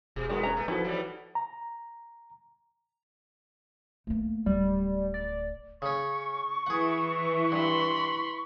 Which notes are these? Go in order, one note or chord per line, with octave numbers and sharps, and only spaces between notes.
E1 B2 G#4
G#2 D#3 G#3 B3 F#4
C#4 A#5
A3
F3 B3 D#4 E4 F#4 A4 C5
E3 F#3 G3
A#5
A3 A#3
D1 G3
D5
C#3 C#4 C#6
E3 G#4 F#5
G2 B5 C6